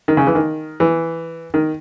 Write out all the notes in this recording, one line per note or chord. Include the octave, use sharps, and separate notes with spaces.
D#3
C#3
E3
D#3
E3
D#3